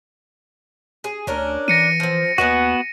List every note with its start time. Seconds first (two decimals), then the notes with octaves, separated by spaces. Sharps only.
1.04 G#4
1.27 D2 C#4 D4 A#4
1.68 E3 A#6 C#7 D#7
2.00 F3 C4
2.38 D#2 B3 F#4 B4 D#5 G#5